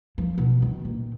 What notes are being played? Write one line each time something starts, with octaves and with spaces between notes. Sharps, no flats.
F3
B2
D#3
A#2